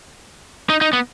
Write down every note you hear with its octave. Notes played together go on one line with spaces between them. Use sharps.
D#4
D#4
B3